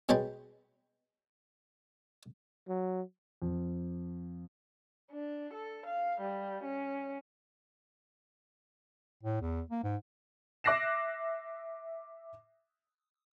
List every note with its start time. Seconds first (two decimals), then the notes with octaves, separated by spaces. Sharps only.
0.09 B2 G#3 C#5 G5 A5 B5
2.69 F#3
3.42 F2
5.11 D4
5.53 A4
5.86 F5
6.21 G3
6.64 C#4
9.23 A2
9.41 E2
9.70 A#3
9.83 G#2
10.64 E5 D6 F#6 A#6 C7 E7